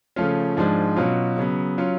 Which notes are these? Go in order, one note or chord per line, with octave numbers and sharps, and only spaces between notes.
C#3 F3 A3 C#4 F4
G#2 F3 G#3 D4
B2 F#3 C#4 F4
C#3 F#3 B3
F#3 C#4 F4